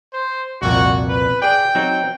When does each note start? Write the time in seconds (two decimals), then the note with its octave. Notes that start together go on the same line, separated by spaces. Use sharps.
0.13 C5
0.62 C2 F2 A#2 F#4
1.09 B4
1.42 G#4 D5 G5
1.75 F#3 C4 D#4